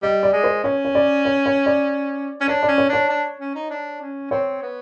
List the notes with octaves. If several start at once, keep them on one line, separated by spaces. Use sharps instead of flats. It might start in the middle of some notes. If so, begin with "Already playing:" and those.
G3 D#5
D5
G#3
C5
C#4 C#5
C#5
D5
C#5
C#5
D5
C#4
D4 C#5
D5
C#4
C#5
D4 C#5
D4
C#4
D#4
D4
C#4
C4 C#5
B3